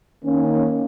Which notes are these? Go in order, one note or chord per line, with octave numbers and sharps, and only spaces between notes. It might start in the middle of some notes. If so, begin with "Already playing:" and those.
D#3 A#3 C#4